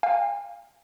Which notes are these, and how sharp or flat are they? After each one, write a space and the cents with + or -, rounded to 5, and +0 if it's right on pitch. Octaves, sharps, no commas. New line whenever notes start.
F5 +0 G#5 -45